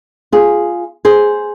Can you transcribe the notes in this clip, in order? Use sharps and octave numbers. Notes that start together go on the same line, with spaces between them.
F4 G#4
G#4 C5